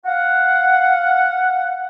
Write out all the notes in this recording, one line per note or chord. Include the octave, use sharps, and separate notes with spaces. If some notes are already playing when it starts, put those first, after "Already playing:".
F5 F#5